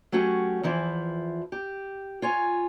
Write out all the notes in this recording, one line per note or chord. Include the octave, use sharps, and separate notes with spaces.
F#3 A3 C#4 F#4 G4
E2 E3 F3 E4
G4
F4 C#5 G#5